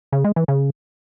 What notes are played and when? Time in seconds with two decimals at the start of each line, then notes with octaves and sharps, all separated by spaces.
0.12 C#3
0.24 G#3
0.36 E3
0.48 C#3